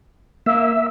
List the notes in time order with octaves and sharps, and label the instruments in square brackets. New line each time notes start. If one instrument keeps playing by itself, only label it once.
[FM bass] A#3 [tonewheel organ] E5